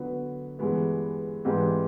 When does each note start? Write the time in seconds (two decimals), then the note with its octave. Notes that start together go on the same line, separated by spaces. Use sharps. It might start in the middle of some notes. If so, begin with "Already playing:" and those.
Already playing: D3 F#3 B3
0.59 G2 E3 G#3 B3
1.45 G#2 E3 G3 C4